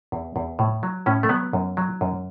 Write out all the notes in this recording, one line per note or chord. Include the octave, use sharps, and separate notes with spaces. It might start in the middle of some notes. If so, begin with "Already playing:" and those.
E2
E2
A2
F#3
A2 C#4
A3
F#3 B3
F#2
F#3
F#2